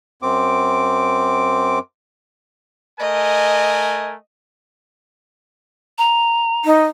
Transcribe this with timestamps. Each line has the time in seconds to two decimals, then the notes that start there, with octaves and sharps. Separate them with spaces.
0.22 F#2 C4 D6
3.00 A3 A#4 D#5 G#5
5.98 A#5
6.65 D#4